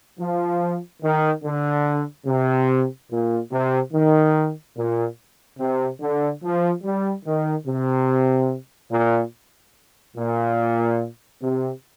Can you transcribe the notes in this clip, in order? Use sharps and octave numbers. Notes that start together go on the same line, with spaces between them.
F3
D#3
D3
C3
A#2
C3
D#3
A#2
C3
D3
F3
G3
D#3
C3
A#2
A#2
C3